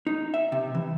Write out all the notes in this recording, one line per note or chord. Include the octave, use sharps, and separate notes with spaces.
D#4
E5
C3
E3